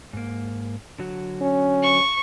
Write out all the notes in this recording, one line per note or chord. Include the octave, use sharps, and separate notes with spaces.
G#2 A#3
D3 F#3 F#4
C#4
C#6